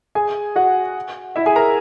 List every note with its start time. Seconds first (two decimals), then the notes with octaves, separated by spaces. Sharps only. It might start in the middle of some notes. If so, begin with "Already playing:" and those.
0.15 G#4 G#5
0.56 F#4 F#5
1.36 E4 E5
1.46 G#4 G#5
1.56 A#4 A#5